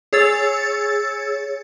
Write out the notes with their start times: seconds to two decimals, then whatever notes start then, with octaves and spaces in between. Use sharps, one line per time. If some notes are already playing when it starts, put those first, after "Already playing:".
0.13 G#4 C#5 E6 A6